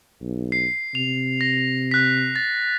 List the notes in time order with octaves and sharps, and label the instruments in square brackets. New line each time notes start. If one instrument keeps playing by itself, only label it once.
[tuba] B1
[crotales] C7
[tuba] C3 [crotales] F7
[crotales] A#6
F#6 B6
A6